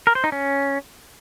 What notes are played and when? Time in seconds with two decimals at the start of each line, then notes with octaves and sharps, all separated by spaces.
0.07 A#4
0.15 C5
0.24 D#4
0.32 C#4